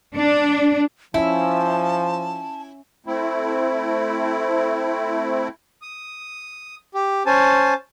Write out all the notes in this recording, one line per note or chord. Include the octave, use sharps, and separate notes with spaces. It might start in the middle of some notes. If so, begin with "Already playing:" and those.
D4
F3 C#4 E4 E5 A5
A3 C4 E4
D#6
G4
C#4 C5 G#5 A5